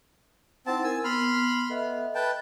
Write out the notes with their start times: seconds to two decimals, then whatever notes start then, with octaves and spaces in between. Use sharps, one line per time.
0.66 C4 D#4 E4 F#5 A5
0.84 C4 A#4 G#5 E6
1.04 B3 B5 C6 F6
1.69 B3 A4 D#5 E5
2.15 B4 G5 A5